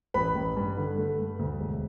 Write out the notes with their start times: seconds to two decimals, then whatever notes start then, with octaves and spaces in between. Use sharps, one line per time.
0.14 A1 B4 B5
0.35 A1
0.56 G2
0.77 D3
0.98 A3
1.19 G2
1.39 D2
1.60 E1